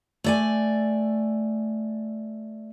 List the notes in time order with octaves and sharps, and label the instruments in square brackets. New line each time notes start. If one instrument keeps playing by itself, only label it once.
[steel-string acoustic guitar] A3 D5 G#5